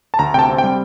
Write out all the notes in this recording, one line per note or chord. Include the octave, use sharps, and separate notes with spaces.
A5
D2 A#5
C3 G5 A5
C4
G5
G3